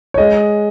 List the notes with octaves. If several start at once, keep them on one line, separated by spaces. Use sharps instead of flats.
C#5
G#3 D#5